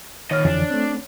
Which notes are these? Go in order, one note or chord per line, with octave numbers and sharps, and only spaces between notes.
A#2 D#3 C#5 D#5 F6
F2 D3 E3 D4
A3 C4